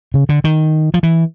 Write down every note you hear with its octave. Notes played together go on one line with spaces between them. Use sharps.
C#3
D3
D#3
F3
E3